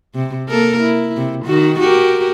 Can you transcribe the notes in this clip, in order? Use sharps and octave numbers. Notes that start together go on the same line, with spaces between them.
C3
A#3 A4 A#4
E4
C3
D#3 F#4
F#4 G4 A#4